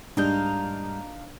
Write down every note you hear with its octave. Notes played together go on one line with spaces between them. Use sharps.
G#2 G3 A#3 D4 D#4 F4 G6